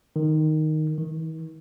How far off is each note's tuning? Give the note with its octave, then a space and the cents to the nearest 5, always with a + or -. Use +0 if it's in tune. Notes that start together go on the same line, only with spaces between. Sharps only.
D#3 -5
D#3 +45